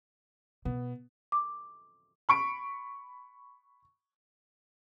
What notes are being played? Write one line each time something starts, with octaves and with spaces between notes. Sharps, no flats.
B2 B3
D6
B5 C#6 D7